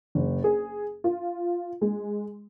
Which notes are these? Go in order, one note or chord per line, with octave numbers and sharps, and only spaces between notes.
F#1
G#4
F4
G#3